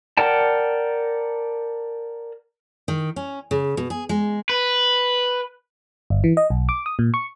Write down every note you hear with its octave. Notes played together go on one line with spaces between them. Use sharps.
A#4 D5 F#5 G5 A5
D#3
C#4
C#3
B2
G#4
G#3
B4
G1
E3
D#5
B1
D6
D#6
A#2
C#6